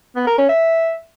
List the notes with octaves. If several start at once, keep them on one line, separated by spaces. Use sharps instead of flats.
B3
A#4
C#4
E5